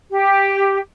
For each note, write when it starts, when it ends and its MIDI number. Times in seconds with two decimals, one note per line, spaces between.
0.11 0.79 67